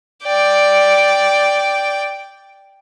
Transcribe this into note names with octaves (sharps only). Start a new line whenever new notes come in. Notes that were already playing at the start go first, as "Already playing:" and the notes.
D5 G5